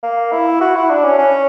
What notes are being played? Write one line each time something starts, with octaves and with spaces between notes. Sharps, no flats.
A#3
E4
F#4
E4
D4
C#4
C#4